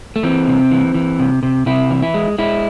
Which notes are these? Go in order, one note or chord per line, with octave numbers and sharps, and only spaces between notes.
A3
E3 C4
C3
E3
E3
C3
C3
C3 E4
E3
E4
G#3
G#3 E4